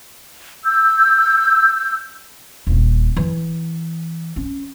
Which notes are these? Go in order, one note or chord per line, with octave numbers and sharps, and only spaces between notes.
E6 G6
D#1 D4
E3
C#4